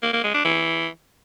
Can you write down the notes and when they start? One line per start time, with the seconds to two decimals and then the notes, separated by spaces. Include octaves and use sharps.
0.03 A#3
0.13 A#3
0.24 G#3
0.34 D4
0.45 E3